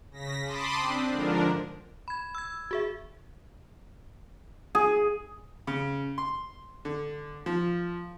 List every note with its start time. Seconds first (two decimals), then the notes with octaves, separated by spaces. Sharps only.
0.11 C#3 A#6 B6
0.45 A5 B5 C6 D6 D#6
0.76 C4 D4
1.11 G#2 D3 F3 D4 A#4
2.08 B5 G#6
2.35 E6 G#6
2.71 F#4 G#4 E5
4.75 G#4
5.67 C#3
6.18 C6
6.85 D3
7.46 F3